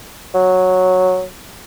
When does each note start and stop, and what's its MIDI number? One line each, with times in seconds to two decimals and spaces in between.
0.34 1.24 54